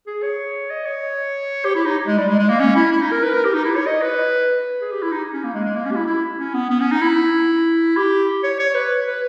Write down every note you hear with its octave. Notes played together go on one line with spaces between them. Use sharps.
G#4
C#5
D#5
C#5
G4
E4
D#4
G#3
G3
G#3
G#3
A#3
C#4
E4
E4
D#4
A#4
B4
A#4
G4
D#4
E4
C#5
D#5
B4
G#4
G4
E4
D#4
C#4
A#3
G#3
G#3
A#3
C#4
G4
E4
E4
C#4
B3
B3
C#4
D#4
E4
G4
C#5
C#5
B4
B4